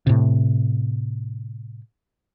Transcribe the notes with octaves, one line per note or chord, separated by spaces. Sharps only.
A2 C3